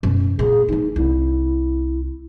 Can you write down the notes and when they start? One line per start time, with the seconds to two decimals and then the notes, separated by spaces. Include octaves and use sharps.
0.03 F#2 B2
0.39 A#2 G#4
0.68 E3 A3 D#4
0.96 C2 E4